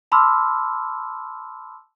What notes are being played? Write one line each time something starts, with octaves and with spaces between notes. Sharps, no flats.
A5 B5 C6 D6 E6 F6